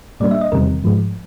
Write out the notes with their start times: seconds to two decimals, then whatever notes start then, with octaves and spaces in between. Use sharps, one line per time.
0.20 A#2 G3 A#3 D4 D5
0.31 E5
0.41 D#5
0.52 E2 C3 D#3 G3 C4 A#4
0.84 G#2 F3 G#3